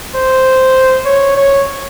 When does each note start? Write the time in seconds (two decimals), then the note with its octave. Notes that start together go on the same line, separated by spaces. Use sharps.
0.15 C5
1.06 C#5
1.37 C#5